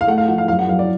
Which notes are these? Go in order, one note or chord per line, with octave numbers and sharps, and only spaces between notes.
F5
A3 F#5
F5
F3 F#5
F5
F#2 F5
F#5
F#2 F5
D5